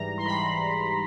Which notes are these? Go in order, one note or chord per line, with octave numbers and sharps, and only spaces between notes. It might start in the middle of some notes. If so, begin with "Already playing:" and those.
Already playing: G#2 E3 G3 A#5
C6
G#2 E3 G3 B5